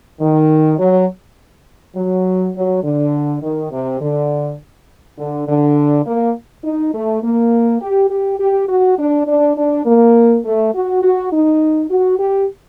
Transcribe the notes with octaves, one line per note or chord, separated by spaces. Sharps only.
D#3
F#3
F#3
F#3
D3
D#3
C3
D3
D3
D3
A#3
D#4
A3
A#3
G4
G4
G4
F#4
D4
D4
D4
A#3
A3
F#4
F#4
D#4
F#4
G4